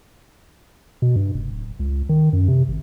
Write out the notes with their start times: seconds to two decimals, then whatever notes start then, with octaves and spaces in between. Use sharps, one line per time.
1.02 B2
1.16 G2
1.34 F1
1.51 D1
1.79 C#2
2.09 D#3
2.33 F#2
2.48 C3
2.68 G#1